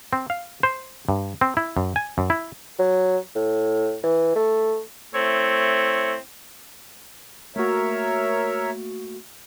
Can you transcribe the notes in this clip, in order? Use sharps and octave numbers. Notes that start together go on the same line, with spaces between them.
C4
F5
C5
G2
C4
E4
F#2
G#5
F#2
E4
F#3
A2
E3
A3
A3 C4 E4 C#5
A3 A#3 F#4 A#4 C#5 E5